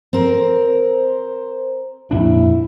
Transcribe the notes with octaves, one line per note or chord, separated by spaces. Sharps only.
C4 A#4
C5
F2 A#2 D4 E4